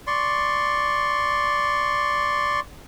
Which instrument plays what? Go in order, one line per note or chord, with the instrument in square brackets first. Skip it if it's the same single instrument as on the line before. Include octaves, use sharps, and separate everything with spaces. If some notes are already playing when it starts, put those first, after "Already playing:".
[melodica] D5 C6 C#6